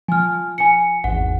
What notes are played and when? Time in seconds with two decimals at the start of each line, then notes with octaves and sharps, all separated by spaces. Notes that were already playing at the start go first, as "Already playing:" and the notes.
0.08 F3 G#5 F6
0.58 G#5 C#7
1.04 G#1 E2 F#5